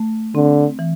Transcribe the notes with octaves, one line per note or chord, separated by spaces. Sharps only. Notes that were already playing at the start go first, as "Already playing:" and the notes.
Already playing: A3
D3 C4
E3